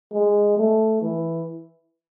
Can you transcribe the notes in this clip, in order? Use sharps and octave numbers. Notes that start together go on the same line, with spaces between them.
G#3
A3
E3